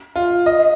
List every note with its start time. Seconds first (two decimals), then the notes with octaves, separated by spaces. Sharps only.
0.16 F4
0.46 D#5